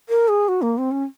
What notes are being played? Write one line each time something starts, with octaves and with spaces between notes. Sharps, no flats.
A#4
G#4
F#4
A#3
C4
C#4